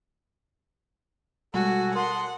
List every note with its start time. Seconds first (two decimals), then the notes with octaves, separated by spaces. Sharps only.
1.54 B2 G3 G#3 F#4 A4 F#5 G#5
1.95 A#4 F#5 A5 C6 D#6